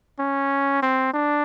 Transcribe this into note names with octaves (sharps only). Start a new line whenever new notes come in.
C#4
C4
D4